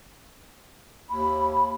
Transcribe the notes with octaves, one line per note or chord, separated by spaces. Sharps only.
D#2 B5